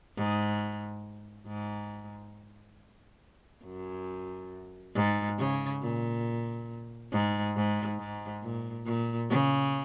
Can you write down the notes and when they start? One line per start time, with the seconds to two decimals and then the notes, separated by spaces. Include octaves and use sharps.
0.17 G#2
1.47 G#2
3.65 F#2
4.95 G#2
5.38 C#3
5.82 A#2
7.13 G#2
7.56 G#2
7.99 G#2
8.43 A#2
8.86 A#2
9.30 C#3